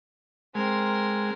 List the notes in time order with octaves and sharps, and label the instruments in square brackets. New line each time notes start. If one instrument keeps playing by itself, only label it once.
[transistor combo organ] G#3 [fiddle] C4 A#4